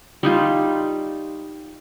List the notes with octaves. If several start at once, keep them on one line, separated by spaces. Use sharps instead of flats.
G3 D#4 F4